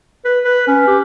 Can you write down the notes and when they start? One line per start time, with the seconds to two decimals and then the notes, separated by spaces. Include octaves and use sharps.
0.25 B4
0.45 B4
0.68 C#4
0.87 G4